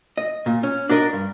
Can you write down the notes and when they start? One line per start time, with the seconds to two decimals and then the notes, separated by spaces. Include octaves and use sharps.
0.18 D#5
0.46 A#2
0.63 C#4
0.89 D4 F#4 A#4 D#5
1.13 G2